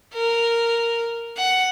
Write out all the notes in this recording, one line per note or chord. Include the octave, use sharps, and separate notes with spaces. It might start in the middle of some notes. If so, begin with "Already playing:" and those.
A#4
F#5